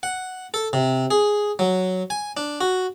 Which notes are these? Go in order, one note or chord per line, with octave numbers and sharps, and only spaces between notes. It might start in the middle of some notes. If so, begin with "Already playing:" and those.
F#5
A4
C3
G#4
F#3
G#5
D4
F#4